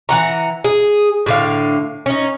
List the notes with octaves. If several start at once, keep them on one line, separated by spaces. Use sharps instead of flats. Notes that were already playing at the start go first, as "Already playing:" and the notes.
E3 F#5 A#5
G#4
A2 D3 F5
C#4 D#4